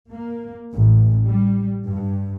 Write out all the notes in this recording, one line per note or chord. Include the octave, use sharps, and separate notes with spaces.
A#3
A1
G3
G2